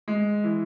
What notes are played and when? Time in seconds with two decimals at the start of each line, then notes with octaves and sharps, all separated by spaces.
0.08 G#3
0.44 E3